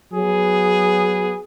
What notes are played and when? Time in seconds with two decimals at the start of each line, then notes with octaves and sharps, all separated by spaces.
0.14 F#3 B3 G#4